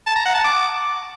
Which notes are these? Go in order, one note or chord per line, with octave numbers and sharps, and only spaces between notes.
A5
A#5
F#5
A5
D6